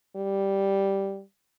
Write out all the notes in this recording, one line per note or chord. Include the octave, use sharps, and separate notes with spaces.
G3